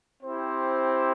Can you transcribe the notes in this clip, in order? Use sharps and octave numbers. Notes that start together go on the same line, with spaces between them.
C4 E4 G4 C5